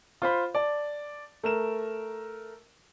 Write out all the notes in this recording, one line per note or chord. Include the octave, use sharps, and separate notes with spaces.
F4 C5 B5
D5 A5
A3 A#4 E7